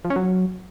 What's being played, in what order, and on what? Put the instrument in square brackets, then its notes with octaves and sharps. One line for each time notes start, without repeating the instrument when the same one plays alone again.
[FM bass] F3
C#4
F#3